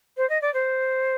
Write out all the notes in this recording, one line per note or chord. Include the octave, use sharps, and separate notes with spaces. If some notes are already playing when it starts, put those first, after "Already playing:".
C5
D#5
D5
C5